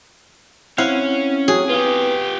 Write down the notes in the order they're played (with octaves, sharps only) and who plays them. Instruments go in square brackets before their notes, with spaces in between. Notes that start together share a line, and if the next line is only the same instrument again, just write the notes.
[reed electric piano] C4 E4 F#5 [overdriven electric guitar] C#4 [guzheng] F5
[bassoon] F#3 [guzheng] G#4
[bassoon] B3 [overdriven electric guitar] F4 G4